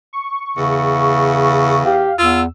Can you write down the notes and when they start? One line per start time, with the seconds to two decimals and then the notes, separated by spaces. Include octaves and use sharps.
0.13 C#6
0.57 E2 C#3
1.85 G4 F5
2.18 E2 F4 E6